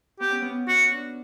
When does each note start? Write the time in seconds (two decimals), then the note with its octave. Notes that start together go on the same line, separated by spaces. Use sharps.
0.20 B3 G4
0.31 C#4
0.42 B3
0.67 C#4 F#4
0.92 D4